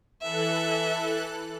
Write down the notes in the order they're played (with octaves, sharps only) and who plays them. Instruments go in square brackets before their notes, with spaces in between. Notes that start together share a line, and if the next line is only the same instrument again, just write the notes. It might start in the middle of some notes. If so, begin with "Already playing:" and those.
[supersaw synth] E3 A4 F#6 [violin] E5